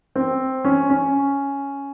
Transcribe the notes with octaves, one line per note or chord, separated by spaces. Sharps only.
C4
C#4
C#4